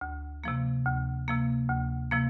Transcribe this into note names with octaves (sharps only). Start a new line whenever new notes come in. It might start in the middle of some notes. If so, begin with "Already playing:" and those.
D2
C3 F3 A#3
D2
C3 F3 A#3
D2
C3 F3 A#3